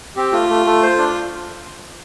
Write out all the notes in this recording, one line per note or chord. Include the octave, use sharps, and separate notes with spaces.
C4 G4
A3 F4
A3
A3
C5
D4